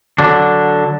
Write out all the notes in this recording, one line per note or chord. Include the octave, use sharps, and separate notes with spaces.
D3 F#3 D4